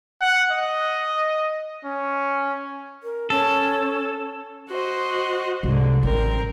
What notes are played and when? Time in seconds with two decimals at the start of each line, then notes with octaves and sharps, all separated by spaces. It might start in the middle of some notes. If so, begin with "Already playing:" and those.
0.21 F#5
0.52 D#5
1.85 C#4
3.03 A#4
3.30 C#4 A4
4.69 F#4 C5 D#5
5.63 C2 G#2 D3
6.03 A1 C4 A#4